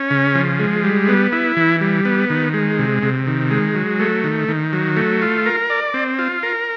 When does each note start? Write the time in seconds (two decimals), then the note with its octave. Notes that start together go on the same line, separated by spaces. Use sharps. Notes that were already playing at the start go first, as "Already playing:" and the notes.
Already playing: C#4
0.11 C#3
0.35 F3
0.60 G#3
0.83 G3
1.08 B3
1.32 E4
1.57 E3
1.81 G3
2.05 B3
2.30 D#3
2.54 G#3
2.79 C3
3.03 C3
3.27 D#3
3.51 G#3
3.75 F#3
3.99 A3
4.24 D#3
4.48 D#3
4.73 F#3
4.97 A3
5.22 F4
5.46 A#4
5.70 D5
5.94 C4
6.19 F4
6.43 A#4